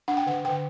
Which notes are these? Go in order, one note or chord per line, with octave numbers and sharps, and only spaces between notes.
D4 F#5
G5
D3 F#5
D3 G5